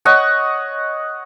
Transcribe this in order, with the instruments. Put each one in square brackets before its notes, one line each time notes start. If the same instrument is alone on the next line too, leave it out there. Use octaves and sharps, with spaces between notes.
[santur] C#5 D#5 F#5 C#6